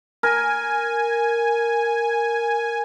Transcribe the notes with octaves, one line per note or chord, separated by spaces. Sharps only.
A#4 G#5